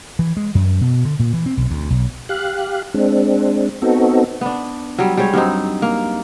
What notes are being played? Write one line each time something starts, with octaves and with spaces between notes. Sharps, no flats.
E3
G#3
F#2
B2
D3
A#2
E3
C4
B1
D2
B1
G4 F5 F#6
G#3 C4 D4
B3 C4 D#4 F#4 A4
B3 D4
F#3 G3
G3 G#3 C5 C#5
G2 F#3 C4 D#4
A#3